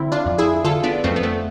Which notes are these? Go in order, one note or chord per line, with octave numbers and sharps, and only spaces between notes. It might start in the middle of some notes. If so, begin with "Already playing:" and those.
Already playing: D3 C4 E4
D4 F4
F2
E4 G#4
D3 F4 A4
B3 D4
F2 A3 C4
B3
A3